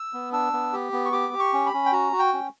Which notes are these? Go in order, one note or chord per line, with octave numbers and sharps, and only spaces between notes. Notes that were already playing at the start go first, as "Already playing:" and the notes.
Already playing: E6
B3
D4 E6
B3
G4
B3
C#6
G4 D6
G4
C#6
C#4
B5
C#4
G5
F#4 A#5
F#4
G5
C#4